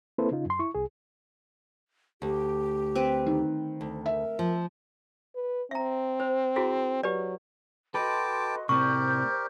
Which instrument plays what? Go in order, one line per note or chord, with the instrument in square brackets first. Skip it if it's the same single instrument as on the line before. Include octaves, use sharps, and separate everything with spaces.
[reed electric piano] A#3 C4 E4 A4 B4 C5
C#3 D#4 F4
F#2 C6
E4 C#6
C2 G#4
[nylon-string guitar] D2 [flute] G4
[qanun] C4 B4
[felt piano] D#3
[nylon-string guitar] D2
[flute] A#4 [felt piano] E5
[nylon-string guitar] F3
[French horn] B4
[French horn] C4 [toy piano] E5 A#5
[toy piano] C5
E4 F#4 G#4
[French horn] F#3 [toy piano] G4 B4 D5
[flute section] F#4 D#5 C6 [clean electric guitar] A4 B4 [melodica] G5 A5 D6
[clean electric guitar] A2 C3 [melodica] G4 A#4 [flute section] C5 D5 G6 [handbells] C#6